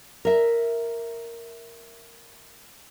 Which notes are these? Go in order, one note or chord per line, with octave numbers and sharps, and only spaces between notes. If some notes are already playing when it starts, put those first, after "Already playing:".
A#4 E5